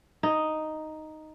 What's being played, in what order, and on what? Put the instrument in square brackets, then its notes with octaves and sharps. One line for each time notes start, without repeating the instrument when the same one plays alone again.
[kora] D#4